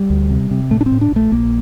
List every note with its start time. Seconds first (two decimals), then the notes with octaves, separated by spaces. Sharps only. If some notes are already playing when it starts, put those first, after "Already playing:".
Already playing: G3
0.10 D2
0.30 C3
0.51 C3
0.71 A2 A3
0.81 D4
0.86 C4
0.92 A2
1.01 D4
1.12 A#1 A3
1.32 A#1 A#3